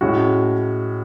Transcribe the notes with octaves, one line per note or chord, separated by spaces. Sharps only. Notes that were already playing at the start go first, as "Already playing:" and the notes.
A2 G#3 C#4 F#4